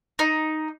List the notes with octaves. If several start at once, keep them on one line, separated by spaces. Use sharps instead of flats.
D#4